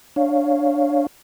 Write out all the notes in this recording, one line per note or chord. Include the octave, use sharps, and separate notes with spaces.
D4 C#5 F5